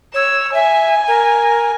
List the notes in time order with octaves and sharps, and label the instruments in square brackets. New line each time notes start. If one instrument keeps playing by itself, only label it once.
[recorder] C#5 [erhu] E6
[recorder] E5 [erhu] G#5
[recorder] A#4